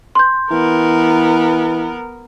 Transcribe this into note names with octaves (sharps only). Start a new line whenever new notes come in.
C6 G6
E3 B3 A#4